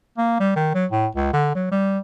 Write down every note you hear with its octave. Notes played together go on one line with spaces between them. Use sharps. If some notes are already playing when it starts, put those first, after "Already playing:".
A#3
G3
D#3
F#3
A2
C#2
D3
F#3
G3